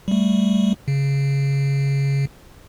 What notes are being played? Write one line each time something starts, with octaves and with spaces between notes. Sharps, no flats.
G3 A3
C#3